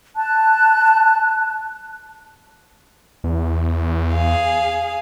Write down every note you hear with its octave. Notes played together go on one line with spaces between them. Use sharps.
A5 F#6
E2
G#4 F5